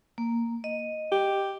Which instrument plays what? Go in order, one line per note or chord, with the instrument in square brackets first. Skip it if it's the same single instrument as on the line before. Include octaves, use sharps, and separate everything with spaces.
[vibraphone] A#3
D#5
[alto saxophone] G4